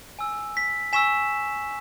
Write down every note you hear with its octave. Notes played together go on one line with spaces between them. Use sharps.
G#5 E6
B6
G#5 C#6 E6 B6 E7